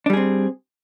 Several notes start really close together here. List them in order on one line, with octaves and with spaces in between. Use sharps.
D4 G3 G#4 C4